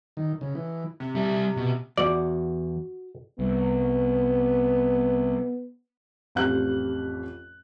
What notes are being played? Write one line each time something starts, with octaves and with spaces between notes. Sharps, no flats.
D#3
C#3
E3
C3
G3 E5
B2
E2 F#4 D5
C2 B3
A1 F2 G4 F5 G5 F#6